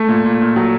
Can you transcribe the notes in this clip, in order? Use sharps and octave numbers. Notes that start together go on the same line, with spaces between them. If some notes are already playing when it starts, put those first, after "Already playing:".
Already playing: A3
A#2
A#2
A#2
F#3